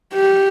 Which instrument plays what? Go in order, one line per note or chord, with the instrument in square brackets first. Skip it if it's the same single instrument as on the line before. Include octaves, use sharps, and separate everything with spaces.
[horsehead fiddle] G4